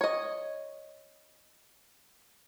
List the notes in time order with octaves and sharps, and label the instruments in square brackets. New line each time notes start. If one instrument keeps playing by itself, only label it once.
[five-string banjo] C#5 D#5